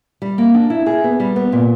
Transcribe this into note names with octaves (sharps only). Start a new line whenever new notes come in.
G3
A#3
D4
E4
G#4
B3
G3
B3
A#2